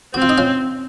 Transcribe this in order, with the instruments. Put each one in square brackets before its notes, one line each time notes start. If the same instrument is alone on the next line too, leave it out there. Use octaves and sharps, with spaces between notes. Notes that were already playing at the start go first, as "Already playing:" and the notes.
[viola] C4 [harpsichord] F#4
[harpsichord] F4
D#4
C#4 F4